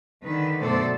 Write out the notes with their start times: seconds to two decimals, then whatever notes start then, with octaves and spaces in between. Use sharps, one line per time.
0.24 D3 D#3 B4
0.60 F#2 B2 A3 A4 C5 D5